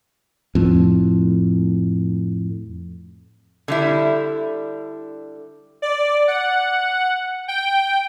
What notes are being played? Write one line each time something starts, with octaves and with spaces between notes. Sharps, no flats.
F2 A2
D3 G3 E4
D5
F#5
G5